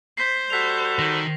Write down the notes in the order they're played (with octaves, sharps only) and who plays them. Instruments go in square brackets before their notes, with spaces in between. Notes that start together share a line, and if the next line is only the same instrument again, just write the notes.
[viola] C5 [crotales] B6 C7
[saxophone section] G3 F#4 A4 [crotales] B6 F7
[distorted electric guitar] D#3 [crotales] A#6